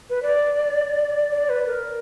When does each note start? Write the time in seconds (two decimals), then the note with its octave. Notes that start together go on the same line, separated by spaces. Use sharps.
0.10 B4
0.23 D5
1.31 D5
1.49 B4
1.67 A#4